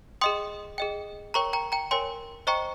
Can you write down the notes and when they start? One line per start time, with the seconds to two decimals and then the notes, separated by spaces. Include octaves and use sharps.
0.21 G#4 D#5 G5 C6 D#6
0.78 G#4 D#5 G5
1.34 A#4 C#5 G5 A#5 C#6
1.53 G5 A#5
1.72 G5 A#5
1.91 A#4 C#5 G5 G#5 C6
2.47 C5 D#5 G5 A#5 C#6